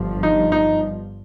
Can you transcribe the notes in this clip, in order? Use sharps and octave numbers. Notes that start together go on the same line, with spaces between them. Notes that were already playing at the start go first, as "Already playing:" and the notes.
Already playing: G1 G2 F3
D#4
D#4